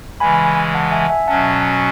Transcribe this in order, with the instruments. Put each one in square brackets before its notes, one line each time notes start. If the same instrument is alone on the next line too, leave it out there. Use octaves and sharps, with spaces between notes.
[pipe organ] C#3 E3 G#3 [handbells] G#5 B5
[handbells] F#5 A5
E5 G#5
E5 G#5
[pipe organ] B2 F#3 C#4 [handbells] F#5 A5